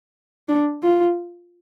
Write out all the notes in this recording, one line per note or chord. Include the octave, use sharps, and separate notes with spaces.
D4
F4